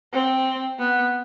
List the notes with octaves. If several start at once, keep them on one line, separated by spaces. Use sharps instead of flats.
C4
B3